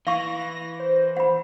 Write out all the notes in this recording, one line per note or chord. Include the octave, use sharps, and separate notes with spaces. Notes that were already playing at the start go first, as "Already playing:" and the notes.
E3 F5 C#6 A#6
C5
F#5 B5